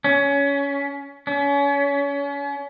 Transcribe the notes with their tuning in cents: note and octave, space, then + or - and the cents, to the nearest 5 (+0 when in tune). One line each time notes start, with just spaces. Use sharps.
C#4 +20
C#4 +35